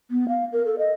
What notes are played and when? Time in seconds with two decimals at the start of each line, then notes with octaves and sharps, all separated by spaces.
0.11 B3
0.28 F5
0.53 A#4
0.66 A4
0.78 D#5